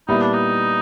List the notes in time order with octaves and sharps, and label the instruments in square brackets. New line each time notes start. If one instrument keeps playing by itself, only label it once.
[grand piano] A#2 G3 B3 E4 [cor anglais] D#4
[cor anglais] D4
D#4